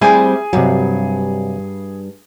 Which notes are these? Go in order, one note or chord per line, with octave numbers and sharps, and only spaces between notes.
G3 C4 E4 G#4 G#5
G2 C3 F#3 G3